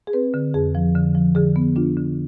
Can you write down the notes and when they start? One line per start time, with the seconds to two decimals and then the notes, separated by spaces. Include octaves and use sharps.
0.07 G#4
0.13 C4 B4
0.34 D3
0.54 F2 G#4
0.75 F3
0.95 D3
1.15 F3
1.35 D3 G#4
1.56 B3
1.76 D4 F4
1.97 D3